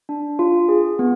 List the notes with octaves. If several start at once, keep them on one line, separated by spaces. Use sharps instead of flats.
D4
F4
G#4
B3